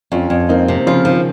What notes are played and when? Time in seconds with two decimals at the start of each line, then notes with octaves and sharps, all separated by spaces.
0.12 F2 C#4 F4
0.30 F2
0.49 A#3 C4 D#4
0.68 C3
0.87 C#3 F3 F4
1.05 D#3 F3